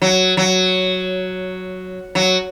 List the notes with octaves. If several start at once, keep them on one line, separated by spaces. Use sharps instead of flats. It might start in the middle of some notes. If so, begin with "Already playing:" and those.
F#3
F#3
F#3